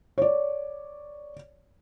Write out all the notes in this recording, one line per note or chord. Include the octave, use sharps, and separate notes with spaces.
C#5 D5